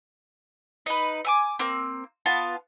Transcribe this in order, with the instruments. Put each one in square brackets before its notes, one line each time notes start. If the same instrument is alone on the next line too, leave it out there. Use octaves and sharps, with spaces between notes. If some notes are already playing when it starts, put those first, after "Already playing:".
[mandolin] D#4 B4
E5 G#5 D6
A#3 C4
B3 F4 A5